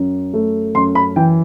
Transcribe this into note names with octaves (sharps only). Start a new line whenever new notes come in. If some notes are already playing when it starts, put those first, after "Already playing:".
Already playing: F#2
A3
F#2 C6
B5
E3 G5